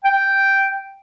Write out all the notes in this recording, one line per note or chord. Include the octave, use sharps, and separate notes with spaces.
G5